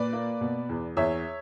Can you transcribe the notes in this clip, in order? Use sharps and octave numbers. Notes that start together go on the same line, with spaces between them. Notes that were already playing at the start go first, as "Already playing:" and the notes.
Already playing: A#2 B4 D5
A#3
B2
E2
E2 C#5 E5